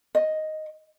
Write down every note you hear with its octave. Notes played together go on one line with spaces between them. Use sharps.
D#5